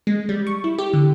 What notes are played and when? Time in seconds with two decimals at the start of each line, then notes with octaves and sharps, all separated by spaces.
0.07 G#3
0.29 G3
0.47 C#6
0.64 E4
0.78 G4
0.93 D3